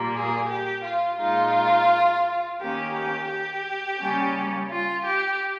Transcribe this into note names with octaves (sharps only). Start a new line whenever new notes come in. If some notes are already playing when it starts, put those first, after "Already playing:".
Already playing: A#2 G3 A#3
G#4
G4
F4
A#2 G#3 D#4 F4
D#3 A#3 C#4 G4
G4
G4
C#3 G3 A#3 C#4
F4
G4